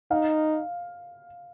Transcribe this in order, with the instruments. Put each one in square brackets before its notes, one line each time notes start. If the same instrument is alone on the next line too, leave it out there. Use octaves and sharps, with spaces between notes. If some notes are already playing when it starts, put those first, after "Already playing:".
[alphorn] D#4 [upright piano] F5